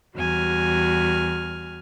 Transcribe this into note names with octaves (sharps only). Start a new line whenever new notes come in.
E2 G3 F#4 G#5 F6